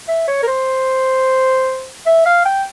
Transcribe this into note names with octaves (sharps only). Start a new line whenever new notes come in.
E5
C#5
A#4
C5
E5
F5
G5